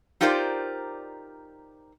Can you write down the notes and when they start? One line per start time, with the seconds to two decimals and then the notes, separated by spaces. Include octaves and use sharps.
0.21 D#4 F4 G4 A#4 C5 D5